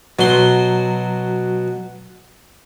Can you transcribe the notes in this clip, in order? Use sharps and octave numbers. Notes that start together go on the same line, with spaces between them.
B2 F#3 C6